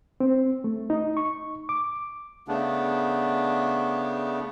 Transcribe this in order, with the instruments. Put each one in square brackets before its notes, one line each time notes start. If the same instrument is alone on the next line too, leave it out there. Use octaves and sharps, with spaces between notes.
[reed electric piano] C4
A3
D#4
C#6
D6
[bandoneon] C#3 A3 B3 D4